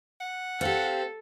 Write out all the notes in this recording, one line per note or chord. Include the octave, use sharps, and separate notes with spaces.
F#5
C4 G4 A4 F5